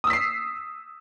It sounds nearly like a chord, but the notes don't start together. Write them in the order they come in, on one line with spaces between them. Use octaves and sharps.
D#6 E6 B6 C7